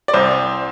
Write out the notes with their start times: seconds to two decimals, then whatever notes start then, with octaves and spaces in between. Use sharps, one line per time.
0.08 D5
0.13 C2 C5